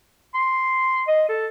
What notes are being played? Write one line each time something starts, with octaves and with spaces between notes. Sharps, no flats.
C6
D#5
A4